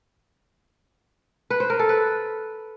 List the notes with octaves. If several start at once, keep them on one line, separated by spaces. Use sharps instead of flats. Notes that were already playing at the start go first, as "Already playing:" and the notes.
B4
C5
A#4
A4
B4